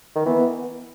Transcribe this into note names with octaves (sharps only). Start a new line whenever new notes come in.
D#3
E3 B3
B3